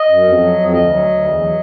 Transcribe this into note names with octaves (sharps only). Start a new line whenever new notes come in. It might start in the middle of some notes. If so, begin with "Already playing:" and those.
Already playing: D#5
F#2
F2
F#3
F2
D2 D#5
F#3
D2
E2
F#3